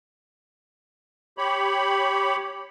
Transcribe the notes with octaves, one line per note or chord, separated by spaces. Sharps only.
G4 C#5 B5